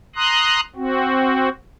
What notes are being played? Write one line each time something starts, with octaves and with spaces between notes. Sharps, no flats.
A#5 C6 D#6 F#6
C4 F#4